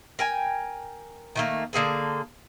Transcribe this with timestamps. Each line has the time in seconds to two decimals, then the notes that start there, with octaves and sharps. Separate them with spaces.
0.19 A#4 G5 G#5
1.36 D#3 A3 A#3
1.73 D3 A#3 G#4 A4